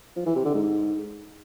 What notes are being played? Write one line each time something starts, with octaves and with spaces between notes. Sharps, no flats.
F3
E3
C3
D3
G#2